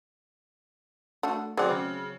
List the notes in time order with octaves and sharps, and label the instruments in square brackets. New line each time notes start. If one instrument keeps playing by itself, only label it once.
[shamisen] A3 D4 F#4
[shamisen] F#3 C4 [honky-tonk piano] G#4 D5 F#5
[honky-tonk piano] C#3